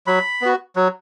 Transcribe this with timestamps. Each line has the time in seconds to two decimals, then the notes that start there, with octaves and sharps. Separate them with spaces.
0.07 F#3 B5
0.41 B3 F#4
0.76 F#3